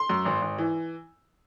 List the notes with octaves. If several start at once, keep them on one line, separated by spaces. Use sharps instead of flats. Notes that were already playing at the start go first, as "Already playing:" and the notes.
Already playing: C6
F#2
G#1
G#1
E3